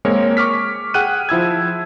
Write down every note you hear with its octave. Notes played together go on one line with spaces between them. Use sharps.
G#3 A#3 C4 A#4 C#5
C#6 D6 F6 B6
G#4 F#5 G5 F6 F#6 D#7
F3 E4 E6 G#6